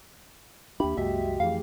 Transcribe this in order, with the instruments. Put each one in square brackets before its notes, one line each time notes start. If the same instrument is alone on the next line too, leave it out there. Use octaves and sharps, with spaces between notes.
[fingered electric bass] D#2 D4 [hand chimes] A#3 E5 [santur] G4 [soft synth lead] B5
[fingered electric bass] C2 F#2 G#3 [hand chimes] F#4 D#5 B6 [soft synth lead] E5
[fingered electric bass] F2 E3 [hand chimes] A3 G#4 [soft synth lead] F5